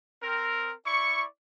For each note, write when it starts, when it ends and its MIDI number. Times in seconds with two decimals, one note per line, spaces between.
0.23 0.73 60
0.23 0.73 70
0.86 1.25 64
0.86 1.25 74
0.86 1.25 85